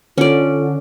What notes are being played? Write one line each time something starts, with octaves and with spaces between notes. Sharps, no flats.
D3 C#4 F4 D5